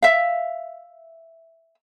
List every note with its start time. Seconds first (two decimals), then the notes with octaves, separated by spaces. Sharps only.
0.03 E5 F5